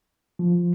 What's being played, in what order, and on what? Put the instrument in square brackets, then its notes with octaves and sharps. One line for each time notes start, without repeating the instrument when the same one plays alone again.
[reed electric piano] F3